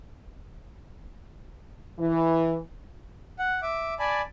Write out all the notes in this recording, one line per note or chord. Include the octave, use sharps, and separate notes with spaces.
E3
F#5
E5 D6
D5 G#5 A5 B5